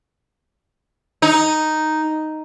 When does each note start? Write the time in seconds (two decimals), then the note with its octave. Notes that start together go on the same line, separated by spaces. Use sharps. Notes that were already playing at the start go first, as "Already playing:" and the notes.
1.22 D#4